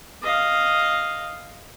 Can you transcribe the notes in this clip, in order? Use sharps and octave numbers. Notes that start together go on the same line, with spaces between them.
D#5 F5